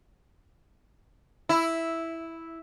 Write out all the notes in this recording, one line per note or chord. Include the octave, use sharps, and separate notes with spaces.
E4